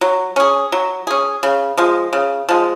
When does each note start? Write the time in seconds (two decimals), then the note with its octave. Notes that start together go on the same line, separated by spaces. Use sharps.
0.01 F#3
0.36 C#4 G#4
0.72 F#3
1.07 C#4 G#4
1.43 C#3
1.77 F3 G#3
2.13 C#3
2.49 F3 G#3